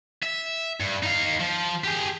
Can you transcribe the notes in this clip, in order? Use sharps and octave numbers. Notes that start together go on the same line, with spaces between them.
E5
G2
D#4 F5
F3
G4 G#4